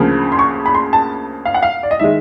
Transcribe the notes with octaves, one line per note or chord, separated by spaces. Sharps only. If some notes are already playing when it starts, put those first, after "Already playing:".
Already playing: D2 C#3 F3 A#3
C6
C#6
B5
C6
A5
F5
F#5
F5
D5
D#5
D#3 G#3 E5